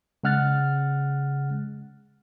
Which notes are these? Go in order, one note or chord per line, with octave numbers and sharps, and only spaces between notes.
C#3 G#3 F#5 F6 F#6 A6